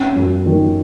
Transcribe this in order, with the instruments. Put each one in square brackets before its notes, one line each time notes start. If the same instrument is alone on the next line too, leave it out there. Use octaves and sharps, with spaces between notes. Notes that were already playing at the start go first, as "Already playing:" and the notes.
Already playing: [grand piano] C#4
F#2
D#3